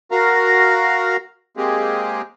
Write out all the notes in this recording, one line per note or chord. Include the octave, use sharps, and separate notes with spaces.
F#4 A#4 F5 A#5
G#3 A#3 C4 G4 G#4